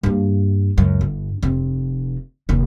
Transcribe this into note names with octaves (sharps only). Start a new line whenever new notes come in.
G2 A#3
C#2 F#2
G1
F1 C4
F1 D#2